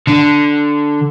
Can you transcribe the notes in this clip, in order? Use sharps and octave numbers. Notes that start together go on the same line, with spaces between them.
D3